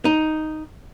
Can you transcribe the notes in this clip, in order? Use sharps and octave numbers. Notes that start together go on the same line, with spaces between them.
D#4